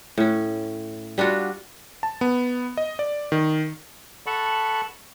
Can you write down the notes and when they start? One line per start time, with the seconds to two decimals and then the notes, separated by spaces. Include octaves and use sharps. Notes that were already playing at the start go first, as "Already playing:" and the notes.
0.18 A2 C#4
1.18 G3 D4 F4 F#4
2.03 A5
2.21 B3
2.77 D#5
2.99 D5
3.32 D#3
4.27 A4 F#5 A5 B5 C#6